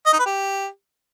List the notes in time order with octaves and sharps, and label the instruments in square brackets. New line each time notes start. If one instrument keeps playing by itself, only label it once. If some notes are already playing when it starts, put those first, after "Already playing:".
[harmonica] D#5
D#4
B4
G4